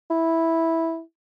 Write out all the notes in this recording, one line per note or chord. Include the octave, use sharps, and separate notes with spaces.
E4